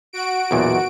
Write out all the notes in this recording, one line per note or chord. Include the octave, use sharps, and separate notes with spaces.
F#4 D7
B1 E2 A#2